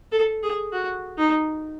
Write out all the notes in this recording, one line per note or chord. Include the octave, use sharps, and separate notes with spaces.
A4
G#4
F#4
D#4